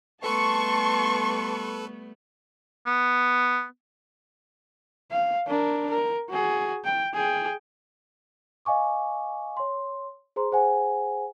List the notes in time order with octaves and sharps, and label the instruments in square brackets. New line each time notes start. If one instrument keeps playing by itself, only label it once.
[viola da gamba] G3 A3 B3 [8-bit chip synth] A4 B4 [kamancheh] A5 C6 [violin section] C#6
[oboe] B3
[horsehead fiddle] F5
D4 A#4
A#4
F#4 G#4
G5
G#4 G5
[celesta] D#5 F5 G#5 C#6 D6
C#5 C6
G#4 C5 A#5 C6
G#4 C5 F#5 G#5